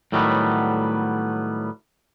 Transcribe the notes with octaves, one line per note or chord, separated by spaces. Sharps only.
A2 D#3 F#3 G3 A3 B3